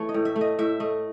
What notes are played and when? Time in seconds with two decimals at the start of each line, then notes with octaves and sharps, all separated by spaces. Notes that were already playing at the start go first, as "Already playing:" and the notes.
Already playing: E3 A3 C#5
0.09 D#5
0.14 A2
0.25 E5
0.36 A3
0.41 D#5
0.59 A2 E5
0.80 A3 D#5